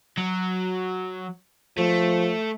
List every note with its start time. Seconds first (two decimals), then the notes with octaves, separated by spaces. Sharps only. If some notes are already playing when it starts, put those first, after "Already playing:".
0.18 F#3
1.78 F3 A3